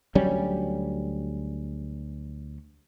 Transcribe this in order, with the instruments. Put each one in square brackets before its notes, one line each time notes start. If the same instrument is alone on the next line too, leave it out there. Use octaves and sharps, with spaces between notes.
[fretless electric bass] D2 F#3 G3 C#4